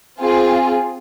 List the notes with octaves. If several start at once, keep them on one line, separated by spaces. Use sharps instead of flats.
C4 F4 G#4